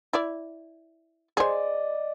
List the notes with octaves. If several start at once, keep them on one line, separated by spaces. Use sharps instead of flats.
E4 D5
G#4 C5 D5 D#5